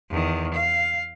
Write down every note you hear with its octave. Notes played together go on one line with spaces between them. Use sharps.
E2 D#3
F5